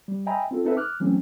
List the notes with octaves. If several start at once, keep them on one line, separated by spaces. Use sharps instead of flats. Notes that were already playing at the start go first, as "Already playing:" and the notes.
G3
D#5 E5 G5 G#5 A#5 B5
C4 F4 A4
C4 D#4 A4 B4 E5
D6 F6 F#6
E3 F#3 A3 C4 C#4